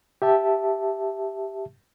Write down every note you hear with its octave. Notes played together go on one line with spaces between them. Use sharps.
G4 E5 A5